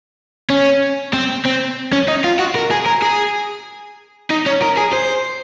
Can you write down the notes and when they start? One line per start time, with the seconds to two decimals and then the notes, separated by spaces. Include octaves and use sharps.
0.50 C#4
1.13 C4
1.45 C4
1.93 C#4
2.08 D#4
2.24 F4
2.39 F#4
2.55 A#4
2.71 G#4
2.86 A#4
3.02 G#4
4.30 D#4
4.46 C#4
4.62 A#4
4.77 G#4
4.93 C5